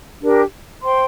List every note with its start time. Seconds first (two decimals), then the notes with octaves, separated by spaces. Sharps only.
0.21 D4 G4 A#4
0.83 C5 G5 C6